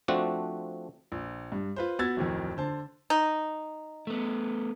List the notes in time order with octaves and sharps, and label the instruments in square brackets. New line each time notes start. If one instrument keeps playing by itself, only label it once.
[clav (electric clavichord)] F3 A3 C4 D4 F#4
[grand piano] A#1
G2
F4 B4 C5
B3 F#4 E6 G#6 A6
D1 F2 D#3
D3 C5 A5
[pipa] D#4
[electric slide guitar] A3 B3